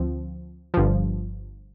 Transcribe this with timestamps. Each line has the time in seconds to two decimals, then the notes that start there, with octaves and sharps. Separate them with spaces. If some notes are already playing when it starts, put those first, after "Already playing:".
Already playing: D2 F3 C4
0.74 G1 G2 F3